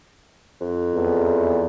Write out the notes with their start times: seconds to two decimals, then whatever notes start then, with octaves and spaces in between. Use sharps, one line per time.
0.61 F2
0.95 E2